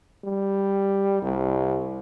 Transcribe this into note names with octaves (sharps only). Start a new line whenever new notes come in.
G3
C2